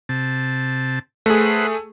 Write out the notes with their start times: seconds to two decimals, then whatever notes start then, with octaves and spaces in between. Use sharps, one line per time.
0.09 C3 A5
1.26 A3 G#4 B4 C5 F#5